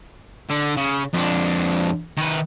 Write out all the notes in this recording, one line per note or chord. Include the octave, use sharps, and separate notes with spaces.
D3
C#3
F2 D4
D#3 B4